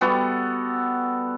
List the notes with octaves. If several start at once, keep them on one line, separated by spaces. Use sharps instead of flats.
G3 B3 F#4 A4